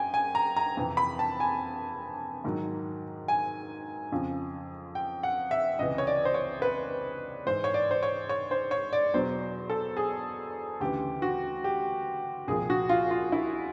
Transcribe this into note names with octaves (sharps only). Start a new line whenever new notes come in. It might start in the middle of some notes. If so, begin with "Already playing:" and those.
Already playing: F#2 G5 G#5
G#5
A#5
A#5
F2 C3 E3
B5
A5
G#5
G#2 D#3 F#3
G#5
F2 C#3 F3
G5
F#5
E5
C#2 C3 E3 D#5
C#5
D5
C5
C#5
B4
G#2 E3 C5
C#5
D5
C5
C#5
C#5
C5
C#5
D5
E2 B2 F#3 C5
A4
G#4
D2 C#3 E3 G4
F#4
G4
C2 A#2 F3 G#4
F#4
F4
F4
E4